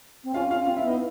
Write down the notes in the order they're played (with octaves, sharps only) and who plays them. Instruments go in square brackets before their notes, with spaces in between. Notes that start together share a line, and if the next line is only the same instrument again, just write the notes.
[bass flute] C4
[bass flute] C#4 [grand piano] F4 F5
[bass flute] C#4 [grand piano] F4 F5
[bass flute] C4 [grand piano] F4 F5
[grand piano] E4 E5
[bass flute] B3
[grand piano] D#4 D#5